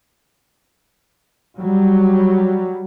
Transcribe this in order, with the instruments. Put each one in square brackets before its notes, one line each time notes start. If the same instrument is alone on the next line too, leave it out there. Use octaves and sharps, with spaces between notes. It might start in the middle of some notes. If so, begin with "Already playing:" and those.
[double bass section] F#3 G3